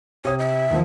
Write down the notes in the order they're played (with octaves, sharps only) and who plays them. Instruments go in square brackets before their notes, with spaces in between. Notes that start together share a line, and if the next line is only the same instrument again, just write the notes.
[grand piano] C3 D#6 [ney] C#5
[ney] E5
[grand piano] D#2 D#3 F3